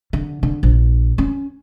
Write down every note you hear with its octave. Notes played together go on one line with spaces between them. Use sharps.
D3
D3
A#1
C#4